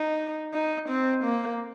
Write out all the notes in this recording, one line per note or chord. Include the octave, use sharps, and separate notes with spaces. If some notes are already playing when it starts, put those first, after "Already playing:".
Already playing: D#4
D#4
C4
A#3